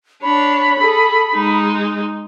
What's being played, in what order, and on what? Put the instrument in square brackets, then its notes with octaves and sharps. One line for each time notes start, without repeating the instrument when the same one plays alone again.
[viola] D4 C#5 [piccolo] B5
[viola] G#4 A4
G#3 D#4